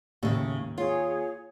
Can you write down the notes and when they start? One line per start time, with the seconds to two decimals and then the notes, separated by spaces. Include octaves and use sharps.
0.23 D#2 A2 C#3
0.78 F4 G#4 C#5